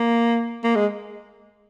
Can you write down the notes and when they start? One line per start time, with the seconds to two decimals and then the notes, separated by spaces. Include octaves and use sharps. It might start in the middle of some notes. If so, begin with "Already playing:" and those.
Already playing: A#3
0.64 A#3
0.75 G#3